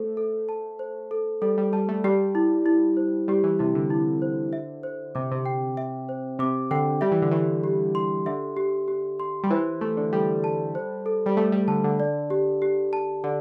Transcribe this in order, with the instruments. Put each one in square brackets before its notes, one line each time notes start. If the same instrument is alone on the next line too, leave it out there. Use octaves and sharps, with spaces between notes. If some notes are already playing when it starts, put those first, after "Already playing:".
Already playing: [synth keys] A3 [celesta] A4 C5
[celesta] A4
A5
C5
A4
[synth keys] G3 [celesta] A4
[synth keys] G3
[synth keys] G3 [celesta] A5
[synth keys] A3
[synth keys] G3 [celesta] G4
[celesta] E4
E4
C5
[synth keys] G3 [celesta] G4
[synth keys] E3
[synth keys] C3 [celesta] E4
[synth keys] D3
[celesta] E4
C5
E5
C5
[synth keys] C3 [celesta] D6
[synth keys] C3
[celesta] G5
E5
C5
[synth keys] C3 [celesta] D6
[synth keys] D3 [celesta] G5
[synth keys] G3 [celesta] E5
[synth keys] E3
D3
[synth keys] E3 [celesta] G4
[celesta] G4
C6
[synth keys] D3 [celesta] E5
[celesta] G4
G4
C6
[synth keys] G3
[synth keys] E3 [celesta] C5
[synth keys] A3 [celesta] A4
[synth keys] D3
[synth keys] G3 [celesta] A4
[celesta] A5
C5
A4
[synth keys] G3
[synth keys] A3 [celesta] A4
[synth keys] G3
[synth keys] D3 [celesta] A5
[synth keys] D3
[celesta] D5
G4
G4
A5
[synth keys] D3 [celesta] D5